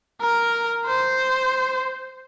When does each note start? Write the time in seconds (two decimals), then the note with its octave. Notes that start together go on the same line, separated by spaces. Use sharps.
0.21 A#4
0.86 C5